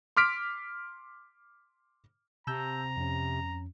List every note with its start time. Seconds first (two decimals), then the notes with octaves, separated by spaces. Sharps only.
0.17 C6 D6 F6 B6 D7
2.47 C3 A5 A#5 E6 G6
2.97 F2 C#4